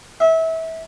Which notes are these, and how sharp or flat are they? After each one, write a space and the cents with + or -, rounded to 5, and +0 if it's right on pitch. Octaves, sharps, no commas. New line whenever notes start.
E5 -25